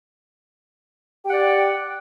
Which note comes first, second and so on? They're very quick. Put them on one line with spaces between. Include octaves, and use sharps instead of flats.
G4 G5 F#5 D5